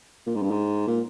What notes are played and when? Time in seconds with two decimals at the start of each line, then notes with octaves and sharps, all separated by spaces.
0.26 A#2
0.35 G#2
0.42 G2
0.51 G#2
0.87 A#2